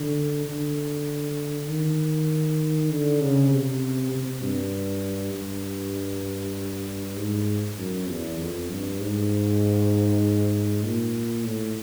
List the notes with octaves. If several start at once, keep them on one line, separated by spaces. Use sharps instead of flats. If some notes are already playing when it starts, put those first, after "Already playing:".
Already playing: D3
D3
D#3
D3
C#3
C3
C3
G2
G2
G#2
F#2
E2
F2
G2
G#2
A#2
A2